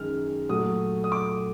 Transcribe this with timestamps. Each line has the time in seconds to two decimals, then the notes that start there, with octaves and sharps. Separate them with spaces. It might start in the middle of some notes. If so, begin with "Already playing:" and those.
Already playing: F#2 D#3 G#3 F6
0.49 A#2 F#3 A3 D#6
1.04 D#6
1.12 D6